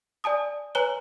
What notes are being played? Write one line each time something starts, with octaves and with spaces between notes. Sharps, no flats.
D5 G#5 A5 D#6
B4 C#5 G#5 A#5 F#6 G7